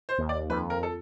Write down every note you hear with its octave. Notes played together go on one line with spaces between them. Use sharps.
C5
D#2
D5
F2 B4
A#4
A4